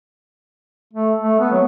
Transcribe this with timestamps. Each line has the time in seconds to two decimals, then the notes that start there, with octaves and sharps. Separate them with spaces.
0.93 A3
1.22 A3
1.39 B3
1.52 F#3